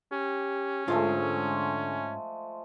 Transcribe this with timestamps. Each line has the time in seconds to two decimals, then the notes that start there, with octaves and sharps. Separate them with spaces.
0.12 C#4 G4
0.88 G#2 D3 F3 G#3 A3 F4